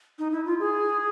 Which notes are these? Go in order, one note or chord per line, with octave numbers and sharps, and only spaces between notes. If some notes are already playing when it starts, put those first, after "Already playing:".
D#4
E4
F4
G#4